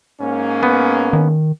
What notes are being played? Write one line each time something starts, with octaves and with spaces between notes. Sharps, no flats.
G#2 A#3 C#4
B3
D#3